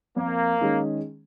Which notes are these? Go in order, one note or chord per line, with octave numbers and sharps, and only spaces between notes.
F2 A#3
D#3 G#3 C#4 G#4